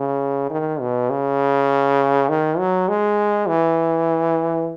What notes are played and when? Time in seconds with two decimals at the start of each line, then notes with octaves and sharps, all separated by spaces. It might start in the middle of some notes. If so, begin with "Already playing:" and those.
Already playing: C#3
0.50 D#3
0.81 B2
1.10 C#3
2.29 D#3
2.58 F#3
2.89 G#3
3.48 E3